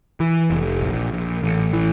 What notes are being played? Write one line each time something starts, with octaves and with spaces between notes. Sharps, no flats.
E3
F1
A#1
A#1
A1
E3